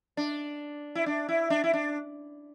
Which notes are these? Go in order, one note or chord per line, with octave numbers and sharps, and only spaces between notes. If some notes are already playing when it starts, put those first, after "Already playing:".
D4
E4
D4
E4
D4
E4
D4